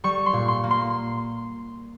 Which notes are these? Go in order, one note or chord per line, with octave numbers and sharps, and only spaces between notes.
G3 C#6
C6
A#2
C6
A#3
C6